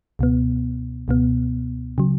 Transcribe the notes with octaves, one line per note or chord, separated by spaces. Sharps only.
C#2 B2 B3
C#2 B2 B3
C#3 F#3